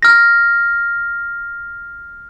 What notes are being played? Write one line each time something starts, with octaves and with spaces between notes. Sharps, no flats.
F6 A#6